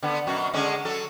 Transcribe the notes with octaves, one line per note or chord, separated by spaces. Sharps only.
D3 B3
F#2 B2 F#4
D3 G#3 C#4
F#3 A4